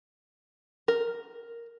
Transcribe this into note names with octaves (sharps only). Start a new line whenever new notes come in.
A#4